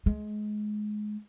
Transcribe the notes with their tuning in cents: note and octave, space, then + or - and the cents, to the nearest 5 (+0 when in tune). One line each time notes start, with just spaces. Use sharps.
G#3 +25